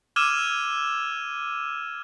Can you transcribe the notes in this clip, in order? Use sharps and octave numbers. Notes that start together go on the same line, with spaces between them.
D6 E6 F6 G#6 D#7 E7